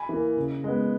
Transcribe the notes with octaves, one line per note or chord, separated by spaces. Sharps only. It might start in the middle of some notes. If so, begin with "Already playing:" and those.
Already playing: G#5 B5
E3 A#3
C#3
G#3 B3